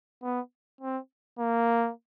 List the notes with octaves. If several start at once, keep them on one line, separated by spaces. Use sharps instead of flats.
B3
C4
A#3